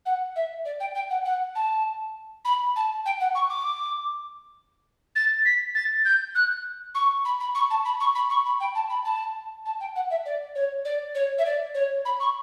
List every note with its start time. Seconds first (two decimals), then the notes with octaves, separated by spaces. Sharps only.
0.06 F#5
0.36 E5
0.65 D5
0.80 G5
0.95 G5
1.10 F#5
1.25 F#5
1.55 A5
2.45 B5
2.76 A5
3.06 G5
3.20 F#5
3.35 C#6
3.50 D6
5.16 A6
5.45 B6
5.75 A6
6.05 G6
6.35 F#6
6.95 C#6
7.25 B5
7.40 B5
7.55 C#6
7.70 A5
7.85 B5
8.00 C#6
8.15 B5
8.30 C#6
8.46 B5
8.60 G5
8.75 A5
8.90 B5
9.05 A5
9.66 A5
9.80 G5
9.96 F#5
10.10 E5
10.26 D5
10.55 C#5
10.85 D5
11.15 C#5
11.38 E5
11.46 D5
11.75 C#5
12.05 B5
12.20 C#6